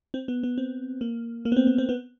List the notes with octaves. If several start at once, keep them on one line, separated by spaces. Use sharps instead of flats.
C4
B3
B3
C4
A#3
A#3
B3
C4
B3
C4
B3